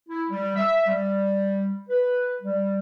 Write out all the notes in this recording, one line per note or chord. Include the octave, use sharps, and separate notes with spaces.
E4
G3
E5
G3
B4
G3